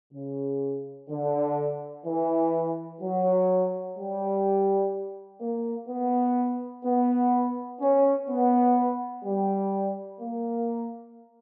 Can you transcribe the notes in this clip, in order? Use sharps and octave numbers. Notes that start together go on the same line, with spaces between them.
C#3
D3
E3
F#3
G3
A#3
B3
B3
C#4
B3
G3
A#3